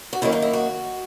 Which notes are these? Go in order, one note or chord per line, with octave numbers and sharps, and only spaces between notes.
F#4
F#2 D#3 A#3 C#4 E4
D#4
E4
F#4